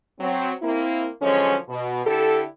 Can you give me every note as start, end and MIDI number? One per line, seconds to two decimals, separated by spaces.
0.20 0.51 54
0.20 0.51 60
0.62 1.08 58
0.62 1.08 60
0.62 1.08 64
1.22 1.55 50
1.22 1.55 53
1.22 1.55 54
1.22 1.55 56
1.22 1.55 61
1.69 2.01 47
2.05 2.41 50
2.05 2.41 64
2.05 2.41 67
2.05 2.41 69